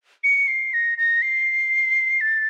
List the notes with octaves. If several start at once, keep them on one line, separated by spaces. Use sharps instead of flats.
C#7
C7
A#6
A#6
C7
A6